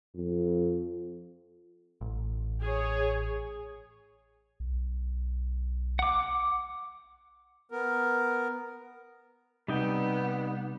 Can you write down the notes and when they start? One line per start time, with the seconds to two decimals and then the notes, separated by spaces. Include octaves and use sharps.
0.15 F2
2.01 A1
2.61 G#4 C#5
4.60 B1
5.99 F#5 D6
7.71 B3 A#4
9.68 C3 G3 B3 D#4 G5